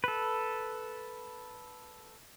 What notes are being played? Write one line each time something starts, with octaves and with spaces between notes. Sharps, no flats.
A4 B4